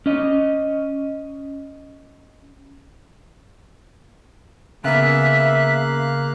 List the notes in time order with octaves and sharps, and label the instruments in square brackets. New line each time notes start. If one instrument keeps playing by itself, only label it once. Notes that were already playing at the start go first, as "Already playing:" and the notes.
[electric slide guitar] C#4 D#5
[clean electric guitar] C#3 B3 [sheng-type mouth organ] A#3 F5 F#6 [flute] E5